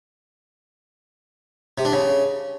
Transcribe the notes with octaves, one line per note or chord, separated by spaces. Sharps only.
C3
D4
C#3